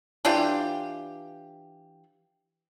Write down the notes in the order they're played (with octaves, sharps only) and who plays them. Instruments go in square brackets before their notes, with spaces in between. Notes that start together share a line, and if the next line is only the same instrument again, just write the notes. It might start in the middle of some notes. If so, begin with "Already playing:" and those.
[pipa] E3 D4 F4 G4